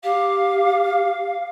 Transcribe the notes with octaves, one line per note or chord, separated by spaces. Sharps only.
G4 F5